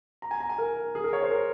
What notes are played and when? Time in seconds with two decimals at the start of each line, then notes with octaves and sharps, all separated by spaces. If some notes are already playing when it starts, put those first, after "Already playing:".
0.22 A#5
0.31 G#5
0.40 A#5
0.50 G#5
0.58 A#4
0.95 G#4
1.04 A#4
1.13 C#5
1.23 C5
1.31 A#4